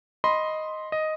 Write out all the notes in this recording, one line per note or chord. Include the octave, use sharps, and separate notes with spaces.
D#5 B5 C6
D#5